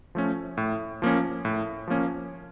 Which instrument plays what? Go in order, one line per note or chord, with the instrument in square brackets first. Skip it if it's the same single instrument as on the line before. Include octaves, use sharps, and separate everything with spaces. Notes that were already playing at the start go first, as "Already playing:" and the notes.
[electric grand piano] F3 A3 C#4
A2
F3 A#3 C#4
A2
F3 A#3 C#4